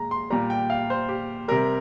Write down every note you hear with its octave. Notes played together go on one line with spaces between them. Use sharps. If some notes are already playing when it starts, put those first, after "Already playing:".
Already playing: A#2 G#3 A#5
C6
A#2 G3 A#5
G5
F5
C5
G4
C3 G3 A#4